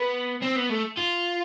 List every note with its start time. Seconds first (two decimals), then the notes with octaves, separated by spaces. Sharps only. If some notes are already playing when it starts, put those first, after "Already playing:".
Already playing: B3
0.42 C4
0.56 B3
0.69 A3
0.97 F4